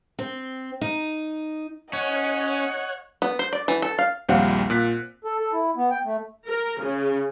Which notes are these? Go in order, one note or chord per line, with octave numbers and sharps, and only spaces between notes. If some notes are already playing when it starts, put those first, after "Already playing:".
C4
D#4
C#4 C#5 D#5 F#5
B3
C5
D5
E3
A4
F5
A#1 D#2 G3 C4 F5 F#5
A#2 F#6 B6
A4
A4
E4
B3
G5
A3
A#4
C#3